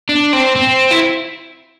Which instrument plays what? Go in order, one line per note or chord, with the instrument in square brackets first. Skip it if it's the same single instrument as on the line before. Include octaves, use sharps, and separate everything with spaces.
[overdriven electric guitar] D4
C4
C4
E4